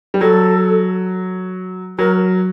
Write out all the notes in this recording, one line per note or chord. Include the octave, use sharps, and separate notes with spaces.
G3
F#3 A4
F#3 A#4